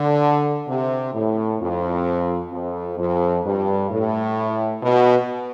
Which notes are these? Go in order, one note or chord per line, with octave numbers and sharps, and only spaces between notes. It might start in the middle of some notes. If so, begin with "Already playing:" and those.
Already playing: D3
C3
A2
F2
F2
F2
G2
A2
B2